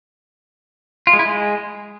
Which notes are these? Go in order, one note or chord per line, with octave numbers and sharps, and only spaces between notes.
F4
G#3
E4
G#3